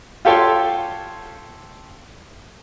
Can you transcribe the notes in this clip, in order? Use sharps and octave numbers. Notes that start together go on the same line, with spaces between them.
F4 G4 A4 C#5 G5 C6